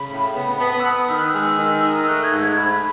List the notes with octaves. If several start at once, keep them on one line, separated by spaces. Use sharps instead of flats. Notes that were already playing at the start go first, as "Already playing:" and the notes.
Already playing: C#3 B5
A2
B3
B3 A5
E6
B3 D#6
D#3 E6
F#6
G#3 E6
D#3
D#4
E6
A3 F#6
G#6
G#2
G#6
G#2 B5